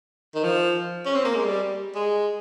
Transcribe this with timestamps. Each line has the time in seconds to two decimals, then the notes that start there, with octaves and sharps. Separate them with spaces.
0.35 D#3
0.44 F3
1.06 C#4
1.15 C4
1.25 A#3
1.35 G#3
1.45 G3
1.95 G#3